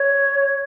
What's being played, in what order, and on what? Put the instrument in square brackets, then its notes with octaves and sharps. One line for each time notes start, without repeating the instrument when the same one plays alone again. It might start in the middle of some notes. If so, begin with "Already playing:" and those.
Already playing: [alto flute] C#5